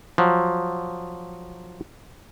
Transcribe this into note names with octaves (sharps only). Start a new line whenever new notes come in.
F3 F#3